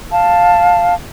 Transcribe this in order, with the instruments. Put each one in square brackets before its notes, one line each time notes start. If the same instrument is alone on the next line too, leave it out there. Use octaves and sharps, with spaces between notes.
[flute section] F5 A5